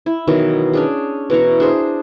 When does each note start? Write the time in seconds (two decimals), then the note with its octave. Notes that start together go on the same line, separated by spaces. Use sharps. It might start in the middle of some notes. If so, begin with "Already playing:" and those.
0.06 E4
0.27 B2 D#3 E3 F#3
0.73 C#4 D4 G#4
1.30 B2 E3 A#5 C#6
1.60 D4 G#4 C5